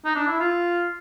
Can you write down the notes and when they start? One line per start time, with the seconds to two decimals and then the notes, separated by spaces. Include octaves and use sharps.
0.05 D#4
0.15 D4
0.27 E4
0.40 F4